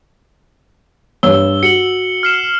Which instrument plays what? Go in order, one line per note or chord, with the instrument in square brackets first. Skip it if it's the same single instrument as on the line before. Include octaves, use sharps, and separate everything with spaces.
[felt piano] G2 C#5 E6 [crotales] G7
[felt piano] F#4 [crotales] C#7 F#7
[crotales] F6 C7 E7